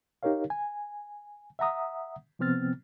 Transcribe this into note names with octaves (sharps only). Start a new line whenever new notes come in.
D#4 G4 A#4 C#5 F5
G#5
E5 F#5 A#5 D#6
C3 F3 B3 C4 F6 A6